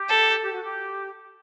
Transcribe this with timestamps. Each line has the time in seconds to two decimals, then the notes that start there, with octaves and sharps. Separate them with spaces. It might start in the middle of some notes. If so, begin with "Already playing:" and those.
Already playing: G4
0.09 A4
0.41 G4
0.53 F#4
0.64 G4